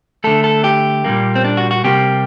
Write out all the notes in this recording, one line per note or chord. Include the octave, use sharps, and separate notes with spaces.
D3 A3 A4
A4
G4
A#2 G3 A#3
C4
D4
F#4
F#4
C3 G3 A#3 G4